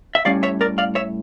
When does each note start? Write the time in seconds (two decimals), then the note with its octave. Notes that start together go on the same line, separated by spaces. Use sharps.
0.15 E5
0.25 A2 G3 C#4 D5 F5
0.43 C#5 E5
0.61 A#4 D5
0.78 D5 F5
0.95 C#5 E5